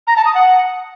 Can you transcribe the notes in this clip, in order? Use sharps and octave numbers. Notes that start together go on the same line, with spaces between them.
A#5
A5
D#6
F#5